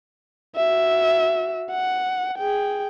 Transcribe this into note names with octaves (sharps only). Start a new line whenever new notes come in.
F#4 E5
F#5
G#4 G5